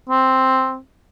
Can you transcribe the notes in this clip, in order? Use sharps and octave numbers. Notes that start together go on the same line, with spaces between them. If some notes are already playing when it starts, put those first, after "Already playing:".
C4